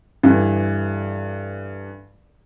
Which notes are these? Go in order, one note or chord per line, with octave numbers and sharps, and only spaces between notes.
G2 D3 E3